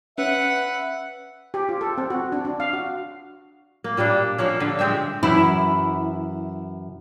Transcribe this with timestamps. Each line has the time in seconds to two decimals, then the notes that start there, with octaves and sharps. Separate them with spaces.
0.18 C#4 B4 E5 F#5
1.54 G4
1.69 F4
1.81 A4
1.98 C4
2.10 F#4
2.32 D4
2.45 D4
2.60 F5
2.73 F#4
3.84 A#3
3.97 A#2 G3 A#3 D4
4.38 F3 A#3 C#4
4.60 D3
4.79 G#3 C4 G4 E5
5.23 F#2 E3 E4